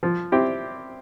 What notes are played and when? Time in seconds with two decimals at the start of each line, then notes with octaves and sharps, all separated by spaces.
0.03 F3
0.32 C4 E4 G4